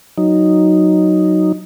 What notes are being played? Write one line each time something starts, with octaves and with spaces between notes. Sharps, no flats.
F#3 D#4